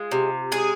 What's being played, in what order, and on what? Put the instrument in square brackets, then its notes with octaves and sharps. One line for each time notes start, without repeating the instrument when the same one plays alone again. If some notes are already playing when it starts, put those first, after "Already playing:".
Already playing: [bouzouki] G#3 F4
C3
G#3 G#4